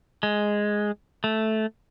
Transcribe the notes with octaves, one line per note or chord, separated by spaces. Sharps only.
G#3
A3